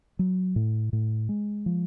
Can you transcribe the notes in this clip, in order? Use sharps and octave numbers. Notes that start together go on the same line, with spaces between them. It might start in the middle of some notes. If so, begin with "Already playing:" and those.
F#3
A2
A2
G#3
F3